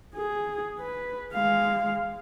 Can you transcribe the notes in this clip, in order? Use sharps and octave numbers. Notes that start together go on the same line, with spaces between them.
G#4
B4
G#3 F5